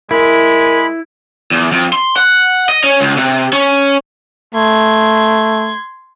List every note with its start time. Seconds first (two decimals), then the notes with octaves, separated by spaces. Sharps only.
0.11 G#3 E4 A#4 B5
1.51 E2
1.72 F2
1.93 C6
2.16 F#5
2.69 D#5
2.84 C#4
3.01 C#2
3.17 C3
3.53 C#4
4.55 A3 C6 G#6